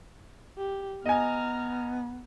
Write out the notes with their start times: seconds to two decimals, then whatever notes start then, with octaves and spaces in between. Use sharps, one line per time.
0.58 G4
1.06 B3 D#5 G#5 A#5 F6